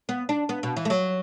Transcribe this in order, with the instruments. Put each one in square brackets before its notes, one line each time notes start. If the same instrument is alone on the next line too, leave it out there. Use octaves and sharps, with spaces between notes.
[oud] B3
D4
B3
B2
E3
A3
F#3